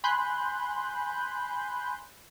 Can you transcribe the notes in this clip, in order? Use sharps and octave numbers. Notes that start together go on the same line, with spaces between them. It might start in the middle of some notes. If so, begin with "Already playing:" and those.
G#5 B5 C6 F#6 G6